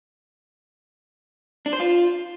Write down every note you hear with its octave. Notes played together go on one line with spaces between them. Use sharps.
D4
C5
F4